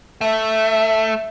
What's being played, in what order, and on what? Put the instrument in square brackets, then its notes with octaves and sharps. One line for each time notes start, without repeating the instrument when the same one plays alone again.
[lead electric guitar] A3 [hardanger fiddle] E5